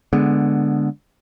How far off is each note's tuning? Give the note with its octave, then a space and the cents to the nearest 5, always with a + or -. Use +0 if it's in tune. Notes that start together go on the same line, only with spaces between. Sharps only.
D3 +0 G#3 +0 B3 +0